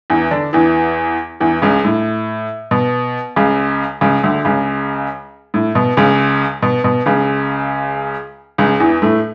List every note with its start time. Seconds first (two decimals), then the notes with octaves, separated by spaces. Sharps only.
0.10 E2 E3
0.31 D3 D4
0.53 E2 E3
1.40 E2 E3
1.62 C#2 C#3
1.85 A2
2.71 B2
3.36 C#2 C#3
4.01 C#2 C#3
4.23 D2 D3
4.45 C#2 C#3
5.54 A2
5.75 B2
5.97 C#2 C#3
6.62 B2
6.84 B2
7.06 C#2 C#3
8.58 C#2 C#3
8.80 E2 E3
9.02 A2 A3